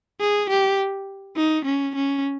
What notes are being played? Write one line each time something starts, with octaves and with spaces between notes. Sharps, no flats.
G#4
G4
D#4
C#4
C#4